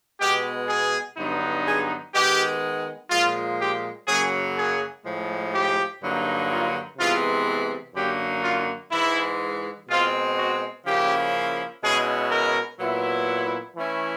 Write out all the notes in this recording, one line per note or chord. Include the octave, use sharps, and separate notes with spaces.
B2 G#3 B3 G4
G#4
G2 D3 F#3 B3 D#4
G#4
D#3 G#3 B3 G4
A#2 F3 G#3 F4
G4
F#2 C#3 F#3 A#3 G#4
G#4
A2 F3 G#3
G4
G2 D3 F#3 A#3 D#4
F4
C3 E3 G#3 B3 F4
F#2 D3 F#3 A#3 D#4 G4
F4
G#2 E3 G#3 E4
B2 G#3 C4 F4
F#4
C#3 F3 A#3 C#4 E4 G4
B2 G#3 C#4 E4 G#4
A#4
A#2 F#3 B3 E4
E3 A3 C#4 E4